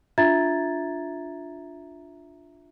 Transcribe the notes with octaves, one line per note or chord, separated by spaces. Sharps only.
D4 F4 E5 A#5 G#6 A6